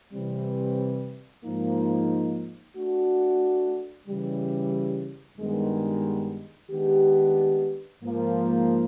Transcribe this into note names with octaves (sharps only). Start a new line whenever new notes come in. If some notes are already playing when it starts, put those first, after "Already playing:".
C3 E3 G3 C4
G#2 F3 A#3 D#4
A3 D4 F#4
C#3 E3 G3
G2 D#3 G#3 B3
D#3 G#3 B3 D4 G4
G#2 F3 A#3